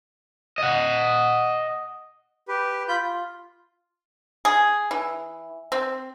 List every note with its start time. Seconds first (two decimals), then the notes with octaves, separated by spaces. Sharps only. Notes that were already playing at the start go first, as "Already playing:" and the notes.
0.58 D#5 F#5
2.48 G4 B4
2.88 F4 B5 G6
3.01 F4
4.45 G#4
4.91 E3
5.72 C4